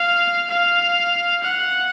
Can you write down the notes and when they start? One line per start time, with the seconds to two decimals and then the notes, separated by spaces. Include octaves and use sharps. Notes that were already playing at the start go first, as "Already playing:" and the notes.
Already playing: F5
0.51 F5
1.44 F#5